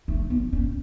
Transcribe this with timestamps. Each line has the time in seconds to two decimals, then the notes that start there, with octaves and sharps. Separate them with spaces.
0.08 A3
0.30 B3
0.53 C#4